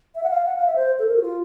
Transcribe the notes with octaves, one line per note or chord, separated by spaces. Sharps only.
E5
F#5
F5
F#5
F5
E5
C5
A4
A#4
F#4
F4